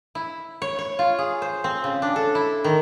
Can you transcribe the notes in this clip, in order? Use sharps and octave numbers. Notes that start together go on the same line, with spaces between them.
E4
C#5
C#5
F4
G#4
C5
C4
C#3
D4
A4
E4
D#3